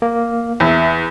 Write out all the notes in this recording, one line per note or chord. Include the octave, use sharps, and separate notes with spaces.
A#3
E2 E5